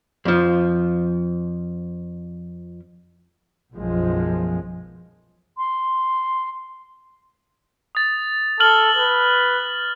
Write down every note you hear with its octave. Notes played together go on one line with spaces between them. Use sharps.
F2 F3
B1 F#2 F3 G#3
C6
D#6 A6
A4 F6 F#7 G7
B4